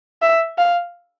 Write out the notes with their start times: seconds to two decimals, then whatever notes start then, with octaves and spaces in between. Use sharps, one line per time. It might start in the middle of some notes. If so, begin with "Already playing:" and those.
0.22 E5
0.58 F5